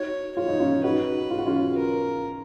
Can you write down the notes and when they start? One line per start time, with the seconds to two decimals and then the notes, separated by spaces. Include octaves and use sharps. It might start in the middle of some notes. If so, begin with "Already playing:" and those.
Already playing: D#4 F#4 C#5
0.36 F4 C#5
0.48 D#4
0.60 C#4 F4
0.84 D#4 F#4 B4
1.30 F4
1.38 F#4
1.46 C#4 F4
1.78 A#4